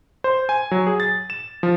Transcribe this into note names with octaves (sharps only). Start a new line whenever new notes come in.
C5
G#5
F#3
G#4
A6
E7
F3